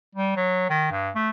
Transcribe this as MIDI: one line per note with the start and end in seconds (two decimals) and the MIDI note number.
0.15 0.33 55
0.36 0.69 54
0.70 0.88 51
0.91 1.10 43
1.15 1.30 57